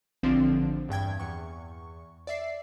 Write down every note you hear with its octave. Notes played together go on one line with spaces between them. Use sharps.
A1 D3 F3 C4 D4
E2 G2 G5 G#6
E2 C#6
D5 E5 C7